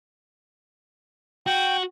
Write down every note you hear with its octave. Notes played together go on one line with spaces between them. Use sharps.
F#4 G5